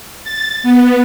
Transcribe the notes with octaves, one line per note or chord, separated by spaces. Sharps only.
A6
B3